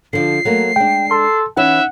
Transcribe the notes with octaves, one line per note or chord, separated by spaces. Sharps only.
D3 F3 D4 C7
F#3 A3 A#3
G#3 D4 G5
A4 C6
E3 C#4 D#4 B4 E5 F#5